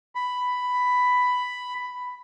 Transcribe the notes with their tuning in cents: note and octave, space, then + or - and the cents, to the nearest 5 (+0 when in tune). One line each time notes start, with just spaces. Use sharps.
B5 +5